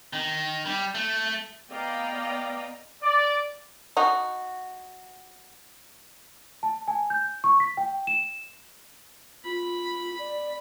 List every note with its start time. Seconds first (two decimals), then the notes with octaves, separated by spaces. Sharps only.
0.13 D#3
0.66 G3
0.95 A3
1.72 B3 D5 D#5 F5 G5 A#5
3.03 D5
3.97 D#4 F#4
6.63 A5
6.88 G#5
7.10 G6
7.44 C#6
7.60 B6
7.77 G5
8.07 E7
9.45 F4 B5
10.19 D5